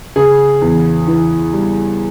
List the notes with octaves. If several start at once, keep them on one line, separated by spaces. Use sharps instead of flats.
C#3 G#4
E2
E3
G3